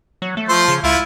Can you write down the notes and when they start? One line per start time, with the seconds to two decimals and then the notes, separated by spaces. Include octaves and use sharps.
0.22 F#3
0.37 A3
0.49 F3 C5
0.68 C#3
0.84 C#2 E4 F4